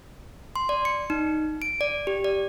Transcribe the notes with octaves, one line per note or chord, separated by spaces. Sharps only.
C6
D5
C#7
D#4
D7
D5
G4
D5